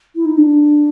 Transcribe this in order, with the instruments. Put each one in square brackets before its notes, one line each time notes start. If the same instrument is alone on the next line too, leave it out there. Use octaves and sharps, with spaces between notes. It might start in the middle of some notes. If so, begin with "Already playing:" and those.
[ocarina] E4
D#4
D4